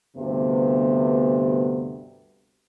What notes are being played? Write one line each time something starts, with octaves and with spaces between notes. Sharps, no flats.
D2 G2 C3 B3